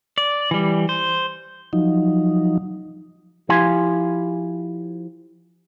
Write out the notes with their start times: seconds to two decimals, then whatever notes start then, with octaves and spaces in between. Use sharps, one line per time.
0.18 D5
0.51 E3 G3
0.89 C5
1.73 F3 F#3 D#4
3.49 F3 E4 G4 F5 G#5 C6